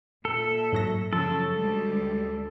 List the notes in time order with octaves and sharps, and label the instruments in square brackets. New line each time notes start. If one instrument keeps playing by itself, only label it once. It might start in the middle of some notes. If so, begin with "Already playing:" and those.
[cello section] A#2 E5 [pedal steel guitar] A4
[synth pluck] G#2 F#3 A#6
[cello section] F#2 C#3 F#3 [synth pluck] F3 [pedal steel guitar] A4
[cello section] D2 G3 G#3